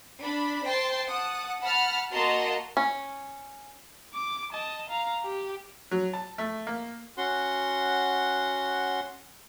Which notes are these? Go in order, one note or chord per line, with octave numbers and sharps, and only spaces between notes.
D4 B5
C5 G5 A5 C6
F#5 A5 D#6
F#5 A5 B5 F6
A#3 F#4 D#5 A5 A#5 C6
C#4
D6
D#5 A5
F5 A#5
G4
F#3
A5
A3
A#3
C#4 F#4 F#5 C6